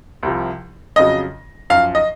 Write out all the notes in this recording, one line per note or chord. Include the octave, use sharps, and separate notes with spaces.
C2 C3 F3
F2 C#3 F#3 D#5
F#2 F3 F5
D#5